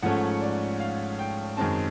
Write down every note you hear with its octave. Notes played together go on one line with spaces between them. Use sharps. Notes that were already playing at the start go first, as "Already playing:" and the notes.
G#2 F3 A3 C#4 F#5
D5
F5
G5
F#2 D#3 G#3 C4 A5